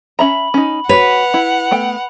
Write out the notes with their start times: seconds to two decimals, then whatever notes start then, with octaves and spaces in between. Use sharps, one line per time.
0.19 C#4 E5 A#5 B5 F#7
0.54 C#4 D#4
0.89 F#4 B4 C#5 F#5 F7
1.34 E4
1.71 A3 B3 G5